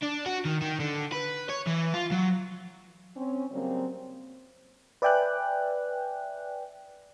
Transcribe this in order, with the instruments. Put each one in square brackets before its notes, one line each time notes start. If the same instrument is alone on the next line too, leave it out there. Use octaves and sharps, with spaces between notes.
[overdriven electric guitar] D4
F#4
D#3
D#3
D3
B4
C#5
E3
F4
F#3
[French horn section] C4 C#4
C#3 F#3 G3 A#3 C4
[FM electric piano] B4 D5 E5 G5 G#5 F#6